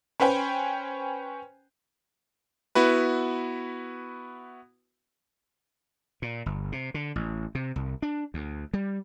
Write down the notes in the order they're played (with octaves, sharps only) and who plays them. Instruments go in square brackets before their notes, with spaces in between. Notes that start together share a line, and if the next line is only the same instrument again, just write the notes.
[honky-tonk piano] C#4 B4 C5 G5 G#5
[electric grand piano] B3 E4 F#4 B4
[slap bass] A#2
G1
C3
D3
A1
C3
C2
D4
D2
G3